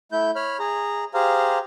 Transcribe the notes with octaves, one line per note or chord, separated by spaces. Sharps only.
A3 E4 G6
C#5 B5 F6
G#4 A#5
G4 G#4 C5 F5 A#5